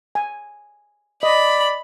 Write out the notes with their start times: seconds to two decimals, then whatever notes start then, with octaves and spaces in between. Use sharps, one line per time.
0.15 G#5
1.23 D5 D#5 B5